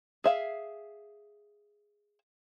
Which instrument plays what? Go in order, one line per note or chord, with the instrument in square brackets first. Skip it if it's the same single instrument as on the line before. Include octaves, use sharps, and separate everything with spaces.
[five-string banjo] G#4 E5 F5